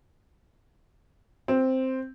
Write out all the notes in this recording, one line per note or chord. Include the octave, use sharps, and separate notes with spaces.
C4